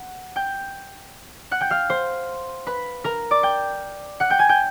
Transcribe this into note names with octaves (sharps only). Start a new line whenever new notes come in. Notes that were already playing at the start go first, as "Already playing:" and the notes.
Already playing: F#5
G5 G6
F#5 F#6
G5 G6
F5 F6
C5 C6
B4 B5
A#4 A#5
D5 D6
G5 G6
F#5 F#6
G5 G6
G#5 G#6
G5 G6